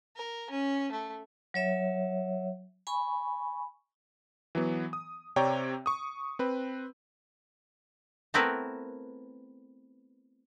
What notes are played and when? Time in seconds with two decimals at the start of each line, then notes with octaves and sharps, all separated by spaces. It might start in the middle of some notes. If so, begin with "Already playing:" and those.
0.16 A#4
0.50 C#4
0.92 A3
1.54 F#3 C#5 E5
2.87 G#5 B5 C#6
4.55 E3 F#3 B3
4.93 D#6
5.36 C3 C4 C#5 D5 G5 A#5
5.86 C#6 D#6
6.39 C4 B4
8.34 A3 B3 C4 E4 A#4 B4